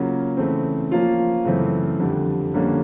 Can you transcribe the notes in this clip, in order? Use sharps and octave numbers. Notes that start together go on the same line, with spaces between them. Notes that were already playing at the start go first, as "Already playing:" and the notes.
Already playing: C#3 F#3 A#3 C#4 F4
C#3 E3 A3 C4
F3 A#3 C#4 F4
F#2 C#3 E3 A3 C4
F2 D3 G3
F2 D3 G3 A#3 C#4